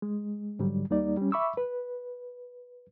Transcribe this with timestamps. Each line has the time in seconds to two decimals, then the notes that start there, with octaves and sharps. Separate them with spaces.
0.02 G#3
0.59 G#2 D3 F#3 G3
0.90 D#2 G3 A#3 D#4 D5
1.17 G3 C#4
1.32 E5 B5 C#6 D6 E6
1.57 B4